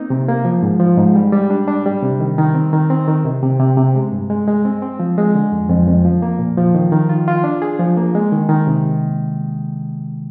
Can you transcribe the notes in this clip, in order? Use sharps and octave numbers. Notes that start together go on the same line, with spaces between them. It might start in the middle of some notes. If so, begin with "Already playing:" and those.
Already playing: A#3 C4 D#4
C3
A#3
F3
G#2
F3
G#2
G3
G3
D4
D4
G3
C3
D#3
D#3
C4
D#3
C4
D#3
C3
C3
C3
C3
G#3
G2
G#3
G#3
C4
C4
F3
G#3
D3
F2
F2
F2
F3
A#3
A#2
F3
D#3
D#3
F4
F4
D4
G#4
F3
A#3
G#3
D#3
D#3
C3